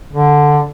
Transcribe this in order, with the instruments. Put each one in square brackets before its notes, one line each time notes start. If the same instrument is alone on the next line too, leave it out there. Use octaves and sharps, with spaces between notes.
[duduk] D3